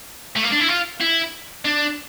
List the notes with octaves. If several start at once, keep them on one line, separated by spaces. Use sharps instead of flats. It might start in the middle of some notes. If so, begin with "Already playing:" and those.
A3
A#3
D4
E4
F4
E4
D4